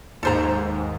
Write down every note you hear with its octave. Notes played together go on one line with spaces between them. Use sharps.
D#2 G#2 A4 C5 A#5